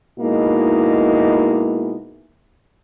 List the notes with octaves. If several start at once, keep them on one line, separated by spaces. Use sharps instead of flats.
B2 G#3 A#3 D#4 E4